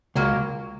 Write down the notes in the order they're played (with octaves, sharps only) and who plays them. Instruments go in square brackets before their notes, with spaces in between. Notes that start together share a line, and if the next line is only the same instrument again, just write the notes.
[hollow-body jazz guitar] C#2 [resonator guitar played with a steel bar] F#3 A#3